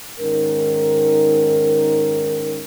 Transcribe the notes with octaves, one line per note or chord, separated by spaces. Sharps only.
G#2 D#3 C#4 A#4